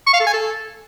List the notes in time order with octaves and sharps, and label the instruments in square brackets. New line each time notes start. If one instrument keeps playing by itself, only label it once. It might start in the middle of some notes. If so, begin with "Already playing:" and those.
[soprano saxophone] C#6
F5
A4
G#5
A4